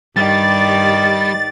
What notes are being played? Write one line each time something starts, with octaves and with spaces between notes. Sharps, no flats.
G2 D#3 G3 D5 A6